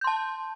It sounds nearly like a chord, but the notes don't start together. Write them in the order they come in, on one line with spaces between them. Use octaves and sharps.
G6 C6 A5